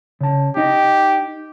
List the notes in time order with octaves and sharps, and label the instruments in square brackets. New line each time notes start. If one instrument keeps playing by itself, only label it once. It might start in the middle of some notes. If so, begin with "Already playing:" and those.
[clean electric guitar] C#3 A5
[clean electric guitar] D#4 D#5 [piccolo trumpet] G4